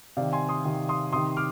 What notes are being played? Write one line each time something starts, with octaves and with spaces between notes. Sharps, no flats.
C3 D#3 D5 F5
G#5 C6
C6 D#6
C3 D#3
C6 D#6
C3 D#3 C6 D#6
D6 F6